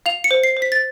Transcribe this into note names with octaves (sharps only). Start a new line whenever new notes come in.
F5 F7
C#7
C5
C7
C5
B6
A6